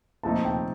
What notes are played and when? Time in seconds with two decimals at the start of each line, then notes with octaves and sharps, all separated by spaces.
0.23 A#2 F3 A3 C4 D#4 A5
0.45 G5